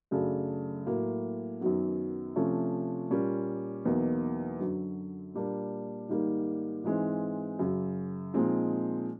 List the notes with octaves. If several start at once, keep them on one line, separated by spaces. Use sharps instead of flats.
F#2 C#3 F#3 A3 D4
A2 F#3 A#3
F#2 D#3 F#3 B3
C3 F3 A3 C#4
A#2 G3 A#3 C#4 F4
E2 B2 F#3 A#3 D#4
F#2 D3 F#3
A#2 G3 A#3 D4
G#2 D#3 G3 A#3
G#2 E3 G#3 C4
F#2 C#3 F#3
A#2 F3 G#3 C4 D#4